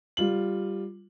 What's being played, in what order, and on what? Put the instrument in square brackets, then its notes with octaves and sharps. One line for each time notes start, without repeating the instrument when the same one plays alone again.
[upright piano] G3 F4 F#7